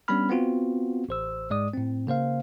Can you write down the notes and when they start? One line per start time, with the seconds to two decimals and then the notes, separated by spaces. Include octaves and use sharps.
0.08 G3 B3 C#4 D4 B5 F6
0.30 B3 C4 F4 F#4
1.09 A1 C5 E6
1.50 G#2 G#3 D5 D#6
1.73 A2 C4
2.07 C#3 A#3 C5 F5